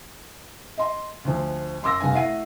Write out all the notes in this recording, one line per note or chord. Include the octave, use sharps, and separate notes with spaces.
D#5 C6
D2 F3
F#2 C6 D6 E6 A#6
F1 G2 B3 F5 G#5
A3 E4 F#5 C7 D#7